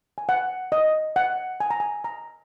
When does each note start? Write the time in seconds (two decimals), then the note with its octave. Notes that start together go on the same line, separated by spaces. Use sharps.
0.18 G#5
0.29 F#5
0.72 D#5
1.16 F#5
1.60 G#5
1.71 A#5
1.80 G#5
2.04 A#5